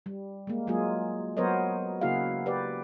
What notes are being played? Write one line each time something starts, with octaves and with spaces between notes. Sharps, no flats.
G3
G#3 A#3
F#3 G#3 A#3 F4 G#4
F#3 B3 A#4 C5 C#5 D#5
C#3 A#3 E4 F#4 G#4 F5
G4 B4 D5